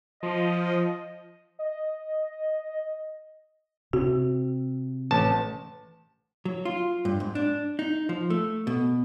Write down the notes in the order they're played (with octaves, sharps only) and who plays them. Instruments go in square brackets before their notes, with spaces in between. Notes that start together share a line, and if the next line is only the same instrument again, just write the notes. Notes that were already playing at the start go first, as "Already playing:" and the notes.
[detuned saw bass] F3 [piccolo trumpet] D#5
[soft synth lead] D#5
[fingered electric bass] C3 [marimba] F#4
[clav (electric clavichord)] A1 A5
[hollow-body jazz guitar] F#3
F4
G2
G#2
D4
D#4
F3
A3
B2